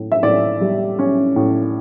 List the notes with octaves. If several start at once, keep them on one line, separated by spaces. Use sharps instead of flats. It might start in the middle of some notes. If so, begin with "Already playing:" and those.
Already playing: A2
E5
A2 D5
G3
C#4
A2